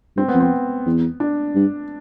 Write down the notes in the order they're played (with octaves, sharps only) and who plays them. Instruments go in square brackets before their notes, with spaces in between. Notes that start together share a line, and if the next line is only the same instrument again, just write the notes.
[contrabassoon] G2 [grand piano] C4
[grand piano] B3
[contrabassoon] F2
[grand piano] C4
[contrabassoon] E2
[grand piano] D4
[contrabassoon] G2